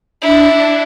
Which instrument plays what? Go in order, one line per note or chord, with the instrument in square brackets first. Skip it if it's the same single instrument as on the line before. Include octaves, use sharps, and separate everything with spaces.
[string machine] D4 [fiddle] E4